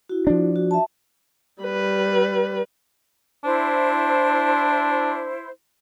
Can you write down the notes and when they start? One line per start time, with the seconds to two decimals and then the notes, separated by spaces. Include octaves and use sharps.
0.09 E4 F#4
0.27 F3 D4
0.56 F#4
0.71 E5 A5
1.62 G3 B4
3.44 D4 E4 C5